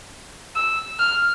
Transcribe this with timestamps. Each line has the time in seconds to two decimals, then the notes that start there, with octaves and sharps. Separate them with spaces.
0.55 E6
0.99 F6